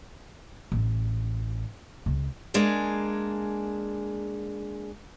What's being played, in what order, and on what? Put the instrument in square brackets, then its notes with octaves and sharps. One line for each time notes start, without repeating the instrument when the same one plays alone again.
[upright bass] A1
C#2
[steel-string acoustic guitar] G#3 A#3 D4 G#4